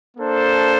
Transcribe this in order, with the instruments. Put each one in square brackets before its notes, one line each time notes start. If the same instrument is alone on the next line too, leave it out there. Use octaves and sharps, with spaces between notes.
[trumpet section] A#3 D4 A4 C5